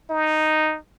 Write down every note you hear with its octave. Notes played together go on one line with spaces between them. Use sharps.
D#4